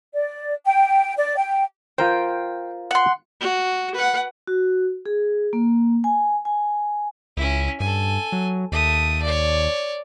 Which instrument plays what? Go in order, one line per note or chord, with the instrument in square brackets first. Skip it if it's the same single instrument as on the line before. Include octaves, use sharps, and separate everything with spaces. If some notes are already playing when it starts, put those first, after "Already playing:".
[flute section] D5
G5
D5
G5
[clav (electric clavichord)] F4 A#4 C5 [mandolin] G5
[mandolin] F#5 C6
[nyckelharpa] F#4
B4 F#5
[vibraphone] F#4
G#4
A#3
G#5
G#5
[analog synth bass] C#2 [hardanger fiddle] C#4 E4
[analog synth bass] G2 [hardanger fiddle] A4 G#5
[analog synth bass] F#3
[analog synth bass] D#2 [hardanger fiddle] A3 D#6
[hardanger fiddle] C#5 D5